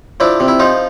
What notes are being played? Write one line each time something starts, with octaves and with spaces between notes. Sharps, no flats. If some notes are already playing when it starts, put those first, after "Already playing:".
F3 D4 E4
C3
E4
F3 D#4 F4